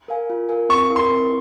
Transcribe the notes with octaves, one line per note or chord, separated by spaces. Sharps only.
A#4 F5 G#5
F4
A#4 F5 G#5
C4 C#6
E4 A#4
C6
C4